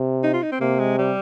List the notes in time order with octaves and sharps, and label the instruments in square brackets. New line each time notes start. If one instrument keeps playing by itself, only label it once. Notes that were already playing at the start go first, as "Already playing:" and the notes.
Already playing: [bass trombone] C3
[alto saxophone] D#4
F4
D#4
C4
[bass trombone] C3 [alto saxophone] A#3
[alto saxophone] G#3
G3